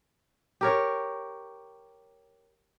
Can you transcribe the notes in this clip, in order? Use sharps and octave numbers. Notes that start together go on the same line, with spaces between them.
G4 A#4 C#5